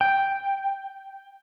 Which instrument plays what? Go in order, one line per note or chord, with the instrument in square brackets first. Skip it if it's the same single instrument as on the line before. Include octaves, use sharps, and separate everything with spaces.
[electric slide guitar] G5